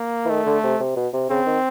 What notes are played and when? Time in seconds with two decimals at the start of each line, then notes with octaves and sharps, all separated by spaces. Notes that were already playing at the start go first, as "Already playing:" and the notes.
Already playing: A#3
0.25 E3
0.29 D#3 A3
0.46 D3
0.63 C3
0.80 C3
0.96 B2
1.13 C3
1.30 C#3 C4
1.46 D#3